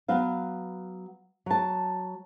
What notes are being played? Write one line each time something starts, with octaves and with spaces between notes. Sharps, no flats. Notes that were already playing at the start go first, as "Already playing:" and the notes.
F#3 B3 B4 F5
F#3 A5